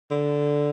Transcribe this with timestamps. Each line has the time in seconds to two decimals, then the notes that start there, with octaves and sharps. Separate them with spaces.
0.11 D3